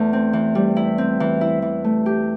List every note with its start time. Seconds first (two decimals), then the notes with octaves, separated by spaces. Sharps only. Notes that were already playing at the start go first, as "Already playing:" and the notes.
Already playing: E2 A3
0.13 C4
0.33 E3
0.55 G3
0.77 E4
0.98 C4
1.20 E3
1.41 E4
1.62 E3
1.84 A3
2.06 G4